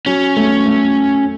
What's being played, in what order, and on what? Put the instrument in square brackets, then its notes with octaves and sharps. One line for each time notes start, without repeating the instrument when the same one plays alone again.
[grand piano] F#3 [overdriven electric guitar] C#4
[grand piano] A3
A3